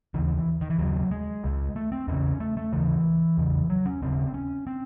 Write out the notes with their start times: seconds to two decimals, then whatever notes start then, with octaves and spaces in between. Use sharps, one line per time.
0.14 D#2 C#3 E3
0.61 D#3
0.70 E3
0.78 D#2 C#3 F#3
1.11 G#3
1.44 C#2 C#3
1.76 A3
1.92 C4
2.08 E2 C#3 C#4
2.40 A3
2.57 A3
2.73 D#2 C#3 E3
3.37 E2 C#3
3.70 F#3
3.86 C#4
4.02 D#2 C#3 C4
4.34 C#4
4.67 C4